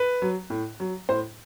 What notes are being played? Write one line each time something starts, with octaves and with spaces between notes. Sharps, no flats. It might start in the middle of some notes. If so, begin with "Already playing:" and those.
Already playing: B4
F#3
A2
F#3
A2 C5